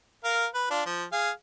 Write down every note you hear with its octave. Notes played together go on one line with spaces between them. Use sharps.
A#4 F5
B4
D4 F4
F3
G#4 F5